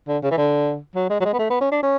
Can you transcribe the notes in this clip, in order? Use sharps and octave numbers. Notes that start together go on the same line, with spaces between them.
D3
C#3
E3
D3
F#3
G#3
F#3
G#3
B3
A3
B3
C#4
D4
C#4